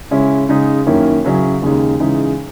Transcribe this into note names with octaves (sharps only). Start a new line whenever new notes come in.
C#3 G#3 C#4 E4
C#3 G#3 D#4
F#2 D#3 A#3 C#4 E4
C#3 F#3 C#4 E4
D#2 C#3 G#3 D#4
C#3 E3 G#3 D#4